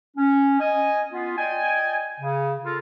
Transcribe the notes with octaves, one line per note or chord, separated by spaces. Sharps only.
C#4
D#5 G#5
B3 F4
D5 D#5 G5 G#5
C#3
F4 A4 A#4